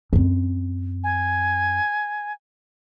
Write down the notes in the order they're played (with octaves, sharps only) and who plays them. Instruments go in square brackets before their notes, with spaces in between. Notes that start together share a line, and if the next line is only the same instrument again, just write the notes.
[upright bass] F#2 C4
[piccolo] G#5